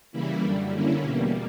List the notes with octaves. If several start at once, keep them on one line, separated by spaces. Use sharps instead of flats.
C#3 E3 G3 A#3 E4
F#2 D3 G3
D3 A#3 C#4 E4
E2 B2 G3 A#3